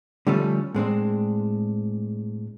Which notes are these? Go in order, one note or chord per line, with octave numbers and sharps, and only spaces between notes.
D3 F3 G3 A3 C#4
A2 G#3 C4 D4